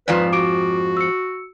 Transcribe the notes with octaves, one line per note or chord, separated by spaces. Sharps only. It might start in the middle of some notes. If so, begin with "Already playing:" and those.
F2 G#2 F3 B4 D5
F#4 D6 D7
E6 C#7